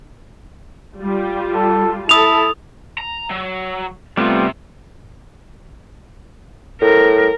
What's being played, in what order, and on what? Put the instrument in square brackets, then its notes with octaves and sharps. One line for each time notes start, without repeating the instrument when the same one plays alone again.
[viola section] G3 F4
[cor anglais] A4
[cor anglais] E4 [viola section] A4 A5 [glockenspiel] D#6 F7
[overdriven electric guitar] A#5
F#3
[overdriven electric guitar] C3 [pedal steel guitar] G3 B3 [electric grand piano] A3 C4 F4
[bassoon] A2 [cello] A#4